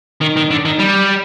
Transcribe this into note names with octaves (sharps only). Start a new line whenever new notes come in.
D#3
D#3
D3
D#3
G3